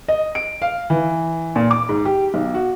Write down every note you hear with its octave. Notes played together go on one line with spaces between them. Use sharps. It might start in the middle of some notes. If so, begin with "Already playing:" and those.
D#5
D7
F5
E3
A#2
D6
G#2
G4
B1
F#4